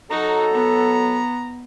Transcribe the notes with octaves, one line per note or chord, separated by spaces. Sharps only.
F#3 D#4 F#4 A4 A#5
B3